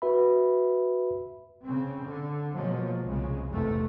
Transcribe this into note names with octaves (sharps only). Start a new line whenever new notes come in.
F#4 B4 E5 B5
C#3 C4
D3
B2 F3 F#3 G#3 A#3
C2 C#3 G#3
F1 E2 G#2 C3 A3